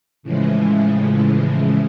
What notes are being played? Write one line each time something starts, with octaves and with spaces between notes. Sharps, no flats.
A2 C#3 E3 F3 G#3